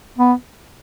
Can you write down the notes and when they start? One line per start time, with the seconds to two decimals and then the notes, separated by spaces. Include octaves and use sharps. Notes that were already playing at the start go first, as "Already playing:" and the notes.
0.18 B3